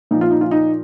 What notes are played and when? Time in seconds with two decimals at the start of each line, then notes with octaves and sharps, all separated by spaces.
0.11 A#2 F3 D#4
0.21 F4
0.31 D#4
0.41 F4
0.51 D#4